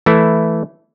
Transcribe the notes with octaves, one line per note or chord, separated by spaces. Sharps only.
E3 A3 E4